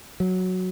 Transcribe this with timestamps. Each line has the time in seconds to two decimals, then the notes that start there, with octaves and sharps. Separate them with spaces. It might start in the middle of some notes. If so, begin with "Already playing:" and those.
0.20 F#3